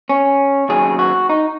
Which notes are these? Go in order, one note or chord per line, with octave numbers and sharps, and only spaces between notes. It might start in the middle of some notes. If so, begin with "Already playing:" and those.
C#4
D#2 C#3 F#3 G#4
F#4
D#4